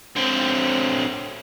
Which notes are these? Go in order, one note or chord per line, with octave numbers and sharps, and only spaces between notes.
D3 C4